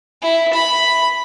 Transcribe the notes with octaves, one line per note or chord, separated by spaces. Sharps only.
E4
B5